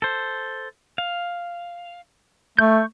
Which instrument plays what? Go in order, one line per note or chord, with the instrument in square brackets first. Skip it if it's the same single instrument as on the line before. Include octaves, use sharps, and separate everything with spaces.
[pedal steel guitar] A4 C5
F5
[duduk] A3 [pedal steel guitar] C#6 G6